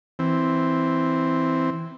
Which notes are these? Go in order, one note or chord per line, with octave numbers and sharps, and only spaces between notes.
E3 C4